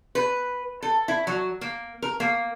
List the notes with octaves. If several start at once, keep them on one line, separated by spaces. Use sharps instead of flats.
B4
A4
E4
F#3
A#3
A#4
A#3